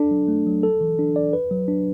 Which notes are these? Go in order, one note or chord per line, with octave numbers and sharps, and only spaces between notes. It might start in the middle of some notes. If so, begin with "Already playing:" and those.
Already playing: D4 A4
F#3
A3
F#3
A4
E3
D4
D5
B4
F#3
D4